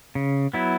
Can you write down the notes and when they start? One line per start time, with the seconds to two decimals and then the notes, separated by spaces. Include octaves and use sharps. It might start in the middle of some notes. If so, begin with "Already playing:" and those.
0.15 C#3
0.53 F#3 B3 E4